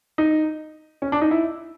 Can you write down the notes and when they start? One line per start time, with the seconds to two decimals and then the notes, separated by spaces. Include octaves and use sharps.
0.18 D#4
1.02 C#4
1.12 D4
1.21 D#4
1.31 E4